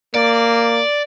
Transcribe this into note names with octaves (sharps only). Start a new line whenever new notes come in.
A#3 D5